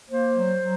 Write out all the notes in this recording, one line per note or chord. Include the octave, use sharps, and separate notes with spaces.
A#3 C5
F#3
F#3